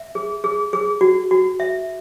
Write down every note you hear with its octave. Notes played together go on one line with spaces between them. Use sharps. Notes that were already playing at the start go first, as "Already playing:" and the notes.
Already playing: E5
G#4
G#4
G#4
F#4
F#4
E5